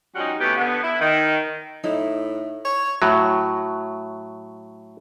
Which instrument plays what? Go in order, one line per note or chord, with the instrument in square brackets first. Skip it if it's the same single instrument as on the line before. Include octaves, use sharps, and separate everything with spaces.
[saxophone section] F3 G3 C#4 D#4 F#4 F#5
A2 C3 B3 C#4 G4
D3 B3
E4
D#3
[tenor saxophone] A2 [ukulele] D#4 E4
[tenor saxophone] C#5
[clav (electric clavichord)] A2 F#3